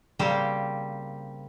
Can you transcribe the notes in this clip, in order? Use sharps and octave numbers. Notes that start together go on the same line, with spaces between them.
C#3 G3 A#3 C4 G4 C5